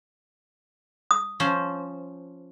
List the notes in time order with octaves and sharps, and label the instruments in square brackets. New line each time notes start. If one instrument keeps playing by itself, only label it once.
[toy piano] D#6
[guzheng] F3 C#4 C5